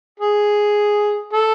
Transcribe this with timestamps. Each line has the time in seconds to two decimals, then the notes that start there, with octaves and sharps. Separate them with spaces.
0.20 G#4
1.33 A4